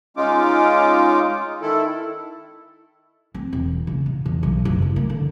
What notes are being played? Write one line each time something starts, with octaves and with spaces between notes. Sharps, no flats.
G#3 C#4 D#4 F4 D6
D#3 E4 A4
C4
E1
C#3
B2
E2
B1
F#1
C#3
A#3
D3